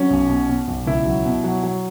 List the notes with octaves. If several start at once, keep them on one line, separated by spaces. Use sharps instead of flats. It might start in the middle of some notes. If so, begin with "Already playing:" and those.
Already playing: F#3 C#4
B1
B2
B2
B1
C#2 E4
F#3
B2
F#3
F#3